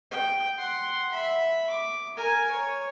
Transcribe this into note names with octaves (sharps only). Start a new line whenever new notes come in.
G5
F#5 C6
E5 B5
D6
A#4 G#5
C#5